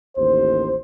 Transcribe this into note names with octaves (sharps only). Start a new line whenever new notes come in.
A1 D#2 C5